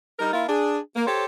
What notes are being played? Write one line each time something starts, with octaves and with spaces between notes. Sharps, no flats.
G3 D#4 A#4
A#3 E4 F4
D4 G#4
A#3
G4 A4 C5 C#5